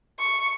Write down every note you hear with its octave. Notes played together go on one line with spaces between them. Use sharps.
C#6